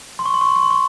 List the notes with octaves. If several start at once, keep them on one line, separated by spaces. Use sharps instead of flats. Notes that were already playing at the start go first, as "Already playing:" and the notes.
C6
C#6
C6
C#6
C6
C#6
C6
C#6